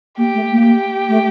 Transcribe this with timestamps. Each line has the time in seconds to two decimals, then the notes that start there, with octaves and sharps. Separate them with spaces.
0.18 A#3 G4
0.35 A3
0.51 A#3
0.68 G4
1.09 A3